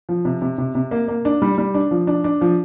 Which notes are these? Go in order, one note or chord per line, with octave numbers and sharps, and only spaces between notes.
F3
C3
C3
C3
C3
A#3
A#3
D4
G3
G3
D4
F3
D4
D4
F3